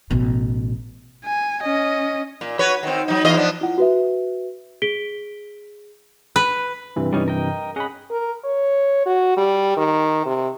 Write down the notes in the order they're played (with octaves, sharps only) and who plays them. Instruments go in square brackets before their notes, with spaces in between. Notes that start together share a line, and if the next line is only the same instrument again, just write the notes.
[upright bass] A1 B2
[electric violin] G#5
C#4 D#5
[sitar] A#2
F#4 B4 C#5
D#3 C4
F#3 D#4
E2 F4 D#5
F3 B3 D4
[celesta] E4 F4 F#5
F#4 B4 E5
G#4 B6 D7 G7
[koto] B4
[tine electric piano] G2 C3 E3
[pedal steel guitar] G3 C#4 D#4
A#4 D#5 G5
[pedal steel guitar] C#4 D#5 F#5 [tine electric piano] G#4 B5
[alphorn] A#4
C#5
F#4
G3
D#3
C3